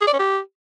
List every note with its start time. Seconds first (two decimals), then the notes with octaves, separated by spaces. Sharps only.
0.01 G#4
0.07 D5
0.13 C#4
0.19 G4